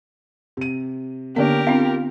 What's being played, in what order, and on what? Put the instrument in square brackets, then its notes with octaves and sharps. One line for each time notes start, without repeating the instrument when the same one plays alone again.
[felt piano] C3 D#7
[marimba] D3 B3 [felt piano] A#3 C#4 D4 [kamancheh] G4 A#4
[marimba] B3 C4 D4 [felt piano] F4